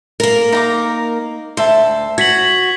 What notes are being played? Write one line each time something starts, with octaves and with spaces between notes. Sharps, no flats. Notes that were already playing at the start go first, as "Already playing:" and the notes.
A#3 A#4
D#4 A#5 D6
D2 C5 E5 A5
F#4 G#6 B6 F#7